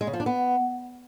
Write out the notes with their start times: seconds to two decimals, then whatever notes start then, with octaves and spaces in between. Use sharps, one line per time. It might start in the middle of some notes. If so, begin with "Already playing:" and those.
0.01 G#3
0.07 C#3
0.13 F3
0.20 D4
0.26 B3